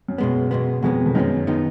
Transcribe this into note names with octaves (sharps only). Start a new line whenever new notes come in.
F#2
B2 G#3 B3
B2 G#3 B3
F2 B2 G#3 B3
F2
F#2 D#3 G#3 B3 D#4
D#3 G#3 B3 D#4